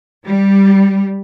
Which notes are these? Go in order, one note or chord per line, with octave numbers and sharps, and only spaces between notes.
G3